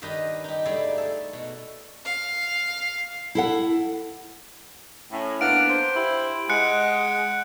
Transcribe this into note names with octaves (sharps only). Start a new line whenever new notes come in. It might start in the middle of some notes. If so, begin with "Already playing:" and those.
G2 D#3 G4 B4 D#5
D#4 G4
G3 A3 D#4 E4 G#4 D5
A4
B2
F5
E4 A4 F#5
A2 C#4
A#3 B3 D4 F#5 F6 D7
C5
E4 G4
G#3 F#5 F#6 C#7